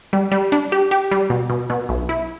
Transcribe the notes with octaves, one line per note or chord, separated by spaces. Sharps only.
G3
G3
D4
G4
G4
G3
B2
B2
B2
B1
E4